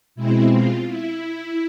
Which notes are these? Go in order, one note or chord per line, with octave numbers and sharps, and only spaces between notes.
B2 G#3 C4 E4
F4
E4